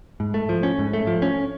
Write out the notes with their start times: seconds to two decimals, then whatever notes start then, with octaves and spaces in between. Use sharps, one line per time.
0.20 G#2
0.34 A3
0.49 F3
0.63 C#4
0.79 G#2
0.93 A3
1.07 F3
1.22 C#4